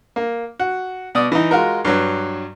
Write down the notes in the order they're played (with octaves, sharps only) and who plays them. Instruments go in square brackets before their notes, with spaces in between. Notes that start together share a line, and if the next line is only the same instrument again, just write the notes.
[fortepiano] A#3
F#4
B2 D5 D#6
E3 D#4
G#3 F4 F#4 A#4
G2 F#3